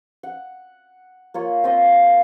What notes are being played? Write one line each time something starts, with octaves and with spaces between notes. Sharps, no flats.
F#5
A#3 F4 C#5
C4 F4 D#5